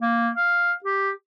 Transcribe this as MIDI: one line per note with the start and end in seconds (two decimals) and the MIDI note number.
0.02 0.30 58
0.36 0.73 77
0.84 1.10 67